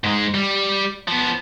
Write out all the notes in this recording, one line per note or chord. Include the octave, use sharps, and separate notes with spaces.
G#2 G#3
G3
F3 B3